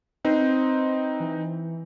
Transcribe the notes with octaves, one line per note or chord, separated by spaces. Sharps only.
C4 D#4 B4 C5
E3